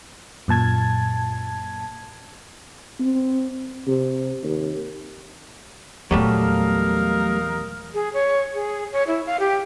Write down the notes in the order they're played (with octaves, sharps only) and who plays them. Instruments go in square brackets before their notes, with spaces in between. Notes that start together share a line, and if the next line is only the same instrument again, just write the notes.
[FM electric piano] F#2 A#2 A5 G#6
[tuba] C4
C3
D#2
[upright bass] E2 A#2 [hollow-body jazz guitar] F#3 G3 A3 [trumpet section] D#4 A#4 F5
[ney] G#4
C#5
G#4
C#5
E4
F5
G4